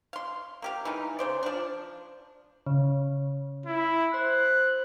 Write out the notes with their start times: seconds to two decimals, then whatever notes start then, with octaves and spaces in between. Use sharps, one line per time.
0.13 F5 C6
0.62 A#3 G4 F5
0.85 E3 G#3 D#4
1.19 C#3 C5 D5
1.43 F3 D4
2.66 C#3
3.66 E4
4.14 C5 F#6